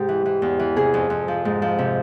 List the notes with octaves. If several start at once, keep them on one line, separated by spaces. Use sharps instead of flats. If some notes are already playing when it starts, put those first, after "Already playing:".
Already playing: G#2 C3 G4
E3
E3
E2
E3
C3 G#4
F2
F2
F3
G#2
F3
C3